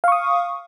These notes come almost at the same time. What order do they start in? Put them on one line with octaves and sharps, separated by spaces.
F5 C#6 D#6